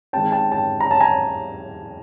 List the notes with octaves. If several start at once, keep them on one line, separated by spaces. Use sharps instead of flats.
D#3 G#3 C4 G5 A5
G5 A5
G5 A5
A#5
A5
G#5 A#5